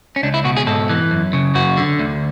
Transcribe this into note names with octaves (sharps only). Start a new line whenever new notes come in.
C#4
C#2 D4
E4
B2 F#4
G#4
G#2 A4
E3
F#2
C#3
F#2 F#4
D3
D2